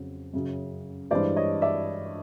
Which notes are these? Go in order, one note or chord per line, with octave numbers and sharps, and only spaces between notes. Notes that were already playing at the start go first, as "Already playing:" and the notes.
Already playing: F2 C#3 F#3
F#2 C#3 F#3
G2 E3 G#3 C5 D5
C#5 D#5
D5 E5